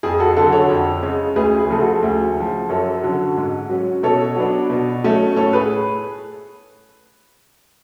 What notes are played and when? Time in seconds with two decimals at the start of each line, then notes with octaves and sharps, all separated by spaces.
0.03 F2 G#4
0.20 F#4 A4
0.37 D3 F#3 F#4 A4
0.52 A4 C#5
0.70 F2
1.03 C#3 G#3 C#4
1.36 D2 G#4 B4
1.59 G#4
1.70 C#3 F3 A3
1.81 F#4 A4
2.03 D2
2.37 C#3 F3
2.69 F#2 A4 C#5
3.04 D3 F#3 C#4
3.37 G#2
3.69 F#3 C#4
4.03 B2 A4 C#5
4.36 F#3 B3 D4
4.70 B2
5.04 F#3 A3 C#4
5.36 A2 A4 C#5
5.53 G#4 B4